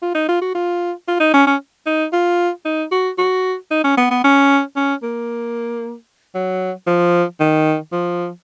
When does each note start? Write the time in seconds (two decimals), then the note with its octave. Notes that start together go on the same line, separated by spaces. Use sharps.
0.02 F4
0.15 D#4
0.29 F4
0.42 F#4
0.55 F4
1.08 F4
1.20 D#4
1.34 C#4
1.47 C#4
1.86 D#4
2.13 F4
2.65 D#4
2.92 F#4
3.18 F#4
3.71 D#4
3.84 C#4
3.97 B3
4.11 B3
4.24 C#4
4.76 C#4
5.03 A#3
6.35 F#3
6.87 F3
7.40 D#3
7.92 F3